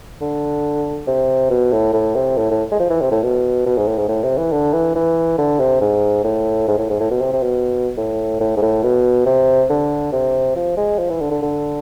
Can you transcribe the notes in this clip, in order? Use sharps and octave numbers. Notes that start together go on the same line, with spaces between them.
D3
C3
B2
A2
A2
C3
A2
A2
G#3
F3
E3
C3
A2
B2
B2
G#2
A2
G#2
A2
C3
E3
D3
E3
E3
D3
C3
G#2
A2
G#2
A2
G#2
A2
B2
C3
C3
B2
A2
A2
G#2
A2
B2
C3
D3
C3
F3
G#3
F3
E3
D3
D3
D3